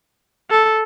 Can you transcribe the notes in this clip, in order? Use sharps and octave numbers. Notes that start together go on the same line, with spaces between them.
A4